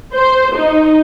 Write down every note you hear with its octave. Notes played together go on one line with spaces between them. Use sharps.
C5
D#4